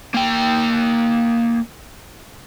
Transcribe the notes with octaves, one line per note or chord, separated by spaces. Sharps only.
A#3 G5